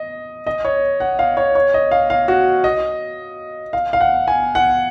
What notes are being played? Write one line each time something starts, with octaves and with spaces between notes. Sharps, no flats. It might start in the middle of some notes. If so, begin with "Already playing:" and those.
Already playing: D#5
D#5
C#5
F#5
F5
C#5
C#5
D#5
F5
F5
F#4
D#5
F5
F5
F#5
G#5
F#5